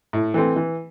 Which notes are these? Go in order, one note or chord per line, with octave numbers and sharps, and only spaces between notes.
A2
E3 A3 C4
E3